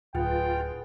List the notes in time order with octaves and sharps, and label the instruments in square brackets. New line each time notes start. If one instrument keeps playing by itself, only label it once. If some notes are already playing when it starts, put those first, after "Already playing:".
[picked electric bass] D1 [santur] B3 G#4 F#5 [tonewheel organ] F4 [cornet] G5